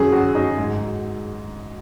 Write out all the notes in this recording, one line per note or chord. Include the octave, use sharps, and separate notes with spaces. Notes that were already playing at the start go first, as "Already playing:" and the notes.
Already playing: F#2 F#3 G#4
F#3 F#4
F#3 D#4
G#2